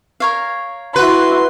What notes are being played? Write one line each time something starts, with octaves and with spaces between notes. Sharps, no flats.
A#4 C#5 F5
E4 F#4 B4 C6